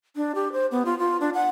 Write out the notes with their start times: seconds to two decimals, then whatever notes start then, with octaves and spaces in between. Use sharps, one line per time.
0.16 D4
0.35 G4
0.52 C5
0.71 B3
0.85 F4
0.99 F4
1.21 D4
1.34 F#5